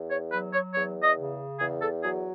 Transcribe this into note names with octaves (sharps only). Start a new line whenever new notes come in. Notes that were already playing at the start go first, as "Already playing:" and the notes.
Already playing: E2
C#5
F#3 B4
C#5
E2 C#5
D#5
C#3
E2 G#4
A4
F#3 G#4